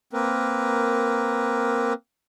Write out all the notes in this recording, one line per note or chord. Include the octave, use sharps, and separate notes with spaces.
A#3 C4 A#4 B4